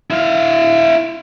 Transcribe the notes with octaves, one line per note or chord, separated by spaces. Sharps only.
E4 F5